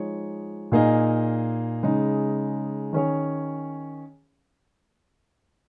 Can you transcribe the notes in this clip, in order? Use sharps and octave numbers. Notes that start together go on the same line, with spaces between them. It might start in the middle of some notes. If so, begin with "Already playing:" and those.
Already playing: F3 G#3 D#4 C#5
A#2 A#3 D#4 G#4 D#5
C#3 G#3 D#4
D#3 C#4 G#4 C#5